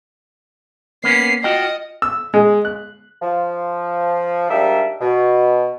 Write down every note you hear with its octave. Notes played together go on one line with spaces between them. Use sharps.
A#3 B3 C#4 C7
F4 F#4 D#5 G5
E6
G#3
F#6
F3
G#2 G3 A#3 D4 D#4 E5
B2